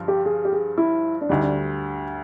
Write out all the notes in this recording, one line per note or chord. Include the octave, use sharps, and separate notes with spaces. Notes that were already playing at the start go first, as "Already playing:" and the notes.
Already playing: G2 D3 F3
G4
G#4
G4
G#4
E4
D4
D2 D3 G3 D#4
D4